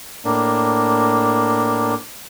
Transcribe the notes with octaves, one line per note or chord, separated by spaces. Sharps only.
A2 A#3 D4